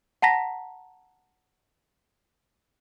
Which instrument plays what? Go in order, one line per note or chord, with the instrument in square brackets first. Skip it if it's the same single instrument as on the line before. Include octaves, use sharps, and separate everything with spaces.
[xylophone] F#5 A5 A#5 A#6 B6